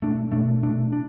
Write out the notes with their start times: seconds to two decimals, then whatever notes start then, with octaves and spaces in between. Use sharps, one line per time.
0.02 B2 A3 D4
0.32 B2 A3 D4
0.63 B2 A3 D4
0.93 D4